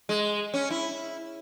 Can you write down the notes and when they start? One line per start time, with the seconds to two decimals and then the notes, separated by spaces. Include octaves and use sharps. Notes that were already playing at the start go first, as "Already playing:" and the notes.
0.09 G#3
0.54 C#4
0.70 E4